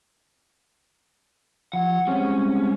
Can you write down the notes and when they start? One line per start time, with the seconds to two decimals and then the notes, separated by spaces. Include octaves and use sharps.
1.73 F3 F#5
2.07 G3 G#3 C4 C#4